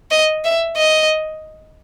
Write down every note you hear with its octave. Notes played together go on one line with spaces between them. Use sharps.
D#5
E5
D#5